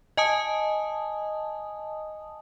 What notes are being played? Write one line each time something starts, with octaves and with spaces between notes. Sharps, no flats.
D#5 G#5 A5 D#6